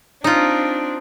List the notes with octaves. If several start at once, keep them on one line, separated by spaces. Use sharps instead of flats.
C4 D4 D#4 F4